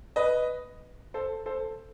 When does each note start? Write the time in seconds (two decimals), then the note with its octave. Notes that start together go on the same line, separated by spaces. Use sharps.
0.16 B4 D#5
1.14 A4 C5
1.46 A4 C5